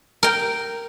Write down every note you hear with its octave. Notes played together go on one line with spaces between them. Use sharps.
A#4 G5